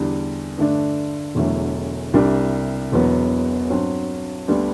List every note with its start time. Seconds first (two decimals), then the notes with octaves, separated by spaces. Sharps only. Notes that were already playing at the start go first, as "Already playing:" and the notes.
Already playing: E2 D3 G3
0.58 G2 D3 A3 D4
1.35 E1 E2 D3 F#3 A3
2.14 C2 C3 G3 D4
2.92 E1 E2 B2 F#3 B3
3.70 G2 F#3 C4
4.48 D2 D3 G3 B3 D4